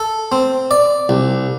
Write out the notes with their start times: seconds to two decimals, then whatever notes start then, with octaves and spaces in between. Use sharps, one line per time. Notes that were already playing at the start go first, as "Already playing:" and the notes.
Already playing: A4
0.32 C4
0.71 D5
1.09 C2